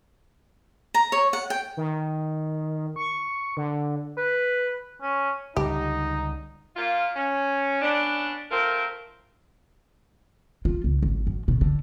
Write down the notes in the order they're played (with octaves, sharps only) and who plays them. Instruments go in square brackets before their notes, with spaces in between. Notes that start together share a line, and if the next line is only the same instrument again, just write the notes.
[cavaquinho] A#5
C#5
F#5
G5
[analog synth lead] D#3
C#6
D3
[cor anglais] B4
C#4
[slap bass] C#2 D3 G3 [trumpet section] D#4 [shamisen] G4
[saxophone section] A#2 A#3 F4
C#4
B3 C#4 D4
A3 C4 F4 A#4
[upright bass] F4
C#2
G#1
F#2
B2
D3